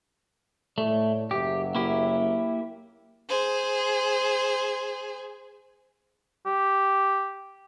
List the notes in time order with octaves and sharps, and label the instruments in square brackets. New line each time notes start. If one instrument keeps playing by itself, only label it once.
[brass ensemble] A2 C#5 D5 [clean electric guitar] A3
[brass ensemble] F#1 F#3 E5 [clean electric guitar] G4
[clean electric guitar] A#3 E4 G4
[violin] G#4 C5
[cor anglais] G4